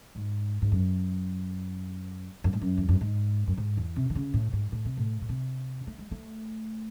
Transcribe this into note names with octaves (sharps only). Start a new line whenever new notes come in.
G#2
G#2
F#2
F#2
G#2
F#2
E2
F#2
G#2
F#2
G#2
E2
C3
D#3
C#3
A2
G#2
A2
C3
A2
A2
C3
A3
G#3
A3